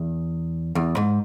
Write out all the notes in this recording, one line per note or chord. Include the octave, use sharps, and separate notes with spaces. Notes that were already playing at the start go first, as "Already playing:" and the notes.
Already playing: E2
E2
G#2